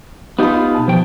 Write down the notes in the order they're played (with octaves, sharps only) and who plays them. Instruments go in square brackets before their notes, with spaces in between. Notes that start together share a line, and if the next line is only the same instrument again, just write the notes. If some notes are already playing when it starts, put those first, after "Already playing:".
[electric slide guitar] B3 D#4 F4 [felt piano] G4 B5
[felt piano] B2 A5
[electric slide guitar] F3 G5